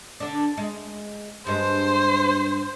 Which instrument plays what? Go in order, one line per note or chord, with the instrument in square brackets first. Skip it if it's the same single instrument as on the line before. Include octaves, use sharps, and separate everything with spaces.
[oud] D3 D4
G#3
[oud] G2 G#3 [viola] C5